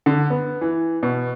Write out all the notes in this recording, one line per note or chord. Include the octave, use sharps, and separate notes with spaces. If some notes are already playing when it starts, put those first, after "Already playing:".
D3
B3
E3
B2